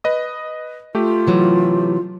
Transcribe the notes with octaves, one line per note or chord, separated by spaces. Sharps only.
B4 D#5 D#6
A3 F4 G4
C3 E3 F#3